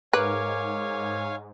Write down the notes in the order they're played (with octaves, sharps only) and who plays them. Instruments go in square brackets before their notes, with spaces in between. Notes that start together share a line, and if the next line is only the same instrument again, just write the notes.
[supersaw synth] G#2 [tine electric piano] A#4 D6 [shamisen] B4 [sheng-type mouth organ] C#5 F5 G#5